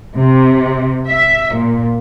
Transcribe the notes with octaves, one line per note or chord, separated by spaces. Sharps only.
C3
E5
A#2